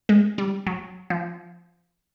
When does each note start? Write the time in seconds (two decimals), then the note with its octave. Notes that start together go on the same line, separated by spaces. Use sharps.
0.09 G#3
0.38 G3
0.67 F#3
1.10 F3